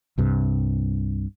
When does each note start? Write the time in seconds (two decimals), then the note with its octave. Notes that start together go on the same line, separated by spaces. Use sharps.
0.18 C2 G2 C3